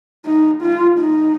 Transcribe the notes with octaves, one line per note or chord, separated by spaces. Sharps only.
D#4
F4
D#4